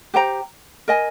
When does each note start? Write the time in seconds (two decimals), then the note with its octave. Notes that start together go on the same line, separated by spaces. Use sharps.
0.14 G4 C5 G5 A#5
0.88 A#4 D#5 G#5